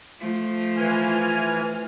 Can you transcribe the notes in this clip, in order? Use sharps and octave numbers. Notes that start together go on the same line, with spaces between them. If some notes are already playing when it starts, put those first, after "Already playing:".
F3 A3
E3 G#5 F6